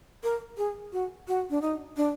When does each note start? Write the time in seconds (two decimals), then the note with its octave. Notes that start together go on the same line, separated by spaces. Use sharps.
0.23 A#4
0.58 G#4
0.93 F#4
1.28 F#4
1.50 D4
1.62 D#4
1.97 D4